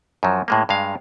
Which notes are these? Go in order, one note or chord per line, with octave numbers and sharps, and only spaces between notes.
F#2 F3 F#3
A2 G#3 A#3
G2 G#3 F5